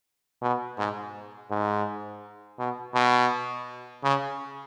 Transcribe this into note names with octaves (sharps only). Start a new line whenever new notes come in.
B2
G#2
G#2
B2
B2
C#3